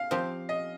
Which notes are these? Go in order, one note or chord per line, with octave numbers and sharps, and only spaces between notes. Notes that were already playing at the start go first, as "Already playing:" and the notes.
Already playing: F5
F3 C4 G4
D#5